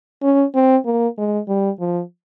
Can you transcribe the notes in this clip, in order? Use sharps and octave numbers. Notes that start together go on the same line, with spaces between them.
C#4
C4
A#3
G#3
G3
F3